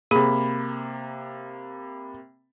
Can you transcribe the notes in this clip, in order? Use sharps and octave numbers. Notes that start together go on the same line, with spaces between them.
C3 A#3 G#4 B5